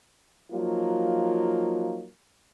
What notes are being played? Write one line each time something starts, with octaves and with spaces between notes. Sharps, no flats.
F3 F#3 A#3 D#4 F4